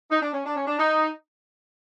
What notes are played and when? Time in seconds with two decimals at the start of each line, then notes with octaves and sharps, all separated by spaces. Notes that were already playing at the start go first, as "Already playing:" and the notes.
0.11 D#4
0.22 D4
0.34 C#4
0.45 D4
0.56 C#4
0.67 D4
0.79 D#4